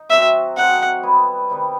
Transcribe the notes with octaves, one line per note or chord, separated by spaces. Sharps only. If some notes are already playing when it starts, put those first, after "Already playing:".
Already playing: D#4
F#3 C4 F#4 E5
F#3 C4 D#4 A4 F#5
G3 B3 E4 B4
C3 D#3 G3 B3